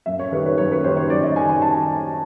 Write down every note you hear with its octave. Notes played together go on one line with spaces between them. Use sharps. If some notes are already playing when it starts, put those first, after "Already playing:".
F#2 E5
C#5
D#3 G3 B4
B4
F#2 C#5
B4
D#3 G3 C5
C#5
F#2 D5
D#5
D#3 G3 G#5
G#5
A5